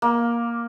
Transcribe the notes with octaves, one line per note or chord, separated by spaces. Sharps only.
A#3